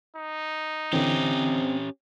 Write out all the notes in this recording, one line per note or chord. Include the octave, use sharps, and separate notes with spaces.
D#4
D3 E3 C4 C#4 G4